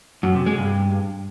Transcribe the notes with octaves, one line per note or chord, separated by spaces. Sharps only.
F#2
C3
G#3
G2